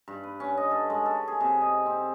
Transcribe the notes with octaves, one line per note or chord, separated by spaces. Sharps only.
G2
B4
C#4
D#5
A4
G#3
A4
G#4
C3
D#5
C4